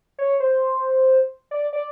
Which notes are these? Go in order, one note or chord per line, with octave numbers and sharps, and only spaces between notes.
C#5
C5
D5
D5